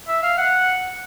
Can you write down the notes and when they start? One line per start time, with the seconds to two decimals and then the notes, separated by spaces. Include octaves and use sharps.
0.08 E5
0.23 F5
0.38 F#5